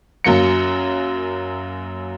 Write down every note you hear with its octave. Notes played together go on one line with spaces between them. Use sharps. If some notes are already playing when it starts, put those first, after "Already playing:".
F#2 F#3 A#3 C#7